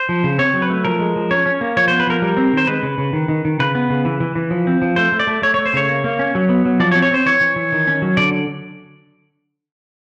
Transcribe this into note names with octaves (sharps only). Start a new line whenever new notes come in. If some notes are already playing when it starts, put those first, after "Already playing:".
Already playing: C5
F3
C#3
C4 C#5
F#3
B4
A3
F3 A#4
G#3
F3
C#4 C#5
C#4
A#3
F3 C#5
B3 C5
B4
F3 A#4
G3
C4
D#3 C5
G#3 B4
C#3
C#3
D#3
D#3
D#3
C#3 B4
B3
C#3
E3
E3
E3
F3
C4
F3
A3 C5
A3
D5
A3
A3 C#5
A3 C#5
C5
C#3 C#5
A#3
A#3
C#4
F#3
B3
F#3
F3 D5
C#5
C4
C#5
C4 C5
E3 C#5
E3
E3
D#3
C#4
F#3
D3 D5